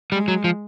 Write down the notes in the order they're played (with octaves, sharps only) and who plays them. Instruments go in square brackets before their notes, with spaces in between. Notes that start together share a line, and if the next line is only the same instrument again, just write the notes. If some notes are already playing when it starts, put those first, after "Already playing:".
[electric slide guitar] G3 [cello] G#3
[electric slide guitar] F#3
F3